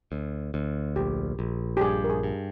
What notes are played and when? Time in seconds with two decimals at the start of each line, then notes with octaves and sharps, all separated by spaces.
0.12 D2
0.54 D2
0.96 A#1 G4
1.39 A#1
1.77 G4
1.81 G2 G#4
2.04 A#4
2.10 G#4
2.23 G2